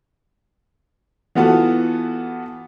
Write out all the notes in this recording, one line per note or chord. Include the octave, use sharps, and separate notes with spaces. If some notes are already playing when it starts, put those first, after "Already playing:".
E3 B3 F4 F#4 A4